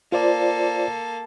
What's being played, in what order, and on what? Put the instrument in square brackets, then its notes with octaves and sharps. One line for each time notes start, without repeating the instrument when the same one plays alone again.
[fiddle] A#3 A4 [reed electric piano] F4 C5 D5